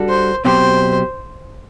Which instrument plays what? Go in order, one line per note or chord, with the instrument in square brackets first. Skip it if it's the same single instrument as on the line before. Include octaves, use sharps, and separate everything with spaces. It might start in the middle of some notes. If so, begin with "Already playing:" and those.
Already playing: [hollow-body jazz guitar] G3 D4 F#4 A4
[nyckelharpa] C5
[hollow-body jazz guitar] B2 F#3 C4 G4 [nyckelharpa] C5